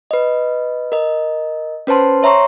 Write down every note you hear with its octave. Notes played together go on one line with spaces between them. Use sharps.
B4 D#5
A#4 D#5
C#4 B4 C5 A5 C6
C#5 E5 A#5 C6 C#6